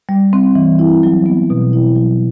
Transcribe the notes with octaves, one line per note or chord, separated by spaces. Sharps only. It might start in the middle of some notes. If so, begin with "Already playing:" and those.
G3
C4
E3
E4
F#3
B3
B2
E4
F#3